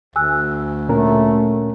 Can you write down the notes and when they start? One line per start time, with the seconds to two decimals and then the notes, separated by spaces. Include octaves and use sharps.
0.16 D2 G#5 E6 F#6
0.89 A#2 A3 C#4 A#4